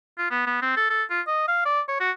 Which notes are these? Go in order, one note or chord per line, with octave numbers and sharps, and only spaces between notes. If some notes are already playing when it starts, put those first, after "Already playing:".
F4
B3
B3
C4
A4
A4
F4
D#5
F5
D5
C#5
F#4